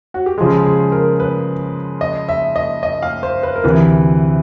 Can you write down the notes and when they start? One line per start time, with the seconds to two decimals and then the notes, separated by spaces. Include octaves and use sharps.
0.14 F#4
0.26 G4
0.38 C#3 F3 G#3 G#4
0.65 G#4
0.92 A#4
1.20 B4
2.01 D#5
2.29 E5
2.56 D#5
2.83 D#5
3.02 F5
3.23 C5
3.43 B4
3.56 A#4
3.64 D2 C3 E3 B4